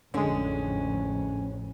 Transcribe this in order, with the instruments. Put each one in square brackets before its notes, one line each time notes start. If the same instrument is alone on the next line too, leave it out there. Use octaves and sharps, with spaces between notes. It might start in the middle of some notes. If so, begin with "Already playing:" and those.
[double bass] A1 F2 [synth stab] D3 G#3 [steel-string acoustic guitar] C#4